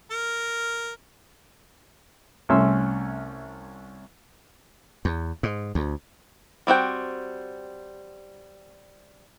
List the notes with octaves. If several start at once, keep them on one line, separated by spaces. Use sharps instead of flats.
A#4
C2 A3 C#4 E5 C6 E6
E2
G#2
D2
G3 C4 F#4 G5